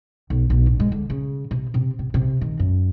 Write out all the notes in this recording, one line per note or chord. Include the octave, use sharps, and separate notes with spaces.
B1
B1
A1
G#3
D3
C#3
C3
C3
C3
C3
D#3
F#2